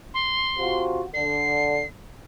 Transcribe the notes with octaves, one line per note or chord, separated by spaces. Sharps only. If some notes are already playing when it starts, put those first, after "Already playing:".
C6
C3 F4 F#4
D3 C7